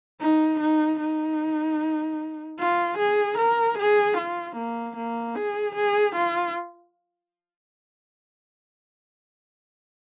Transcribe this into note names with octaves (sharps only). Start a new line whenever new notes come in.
D#4
D#4
D#4
F4
G#4
A#4
G#4
F4
A#3
A#3
G#4
G#4
F4